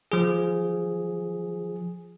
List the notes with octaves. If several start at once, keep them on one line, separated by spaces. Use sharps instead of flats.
F3 G#4